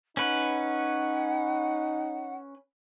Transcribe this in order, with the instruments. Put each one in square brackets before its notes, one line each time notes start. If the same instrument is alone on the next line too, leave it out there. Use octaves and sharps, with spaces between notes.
[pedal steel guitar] C#4 B4 [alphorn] D#4 [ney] F#5